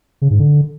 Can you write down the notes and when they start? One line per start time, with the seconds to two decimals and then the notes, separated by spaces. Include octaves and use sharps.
0.22 C#3
0.30 G#2
0.39 D3